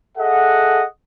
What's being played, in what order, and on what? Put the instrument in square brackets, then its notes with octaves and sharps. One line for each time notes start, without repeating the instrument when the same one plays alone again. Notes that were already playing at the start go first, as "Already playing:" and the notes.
[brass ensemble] G#4 A4 D#5 E5 F#5